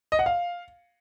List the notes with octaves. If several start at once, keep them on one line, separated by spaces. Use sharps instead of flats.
D#5
F#5
F5